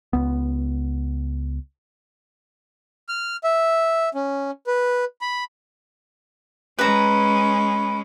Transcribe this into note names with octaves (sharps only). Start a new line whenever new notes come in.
C#2 B3
F6
E5
C#4
B4
B5
G#3 C#4 B4 A#5